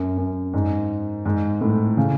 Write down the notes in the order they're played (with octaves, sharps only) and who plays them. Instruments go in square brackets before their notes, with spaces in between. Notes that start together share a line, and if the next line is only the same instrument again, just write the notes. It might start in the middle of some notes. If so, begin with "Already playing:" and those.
Already playing: [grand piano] F#2
F#2
G#2
G#2
A2
C#3